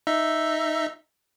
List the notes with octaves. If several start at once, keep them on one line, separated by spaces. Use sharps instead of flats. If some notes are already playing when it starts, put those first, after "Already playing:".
D#4 E5